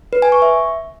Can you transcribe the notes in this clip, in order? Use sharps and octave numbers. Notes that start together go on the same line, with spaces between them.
B4
G#5
C#6
E5